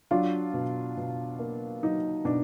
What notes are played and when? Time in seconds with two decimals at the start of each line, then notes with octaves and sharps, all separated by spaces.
0.11 F#3 D4 F4
0.54 B2
0.97 B2
1.39 A#3
1.82 F#3 D#4
2.25 B2 D4